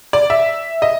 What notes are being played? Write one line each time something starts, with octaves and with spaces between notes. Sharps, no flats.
D5
E5
D#5